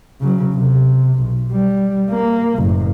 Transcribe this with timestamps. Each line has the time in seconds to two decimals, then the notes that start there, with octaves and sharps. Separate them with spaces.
0.21 C#3 F#3
0.55 C3
1.20 B1
1.52 G3
2.11 A#3
2.58 F#1 A2